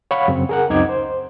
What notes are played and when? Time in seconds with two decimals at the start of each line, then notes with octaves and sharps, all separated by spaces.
0.11 C#5 F5 F#5 B5 C#6
0.28 F#2 C#3 C4
0.49 G#4 A#4 F#5
0.70 C#2 F#2 C4 D#4 D6 G#6
0.89 C5